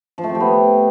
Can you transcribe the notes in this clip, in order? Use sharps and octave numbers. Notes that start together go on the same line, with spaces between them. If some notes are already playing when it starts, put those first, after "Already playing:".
F3
A3
C4
G4
B3